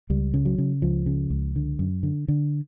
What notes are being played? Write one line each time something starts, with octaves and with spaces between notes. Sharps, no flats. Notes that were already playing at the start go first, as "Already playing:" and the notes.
C#2 G3
C#3
F#3
C#3
C#2 F3
C#3
C#2
D3
F#2
D3
D3